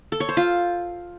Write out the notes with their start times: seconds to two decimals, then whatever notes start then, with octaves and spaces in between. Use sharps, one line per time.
0.12 A4
0.20 C#5
0.29 C5
0.37 F4